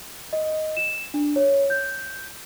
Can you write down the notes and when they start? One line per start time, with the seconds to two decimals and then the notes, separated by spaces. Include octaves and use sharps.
0.33 D#5
0.77 E7
1.14 D4
1.36 C#5
1.70 G6